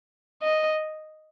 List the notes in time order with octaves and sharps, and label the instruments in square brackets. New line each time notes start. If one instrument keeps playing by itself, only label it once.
[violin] D#5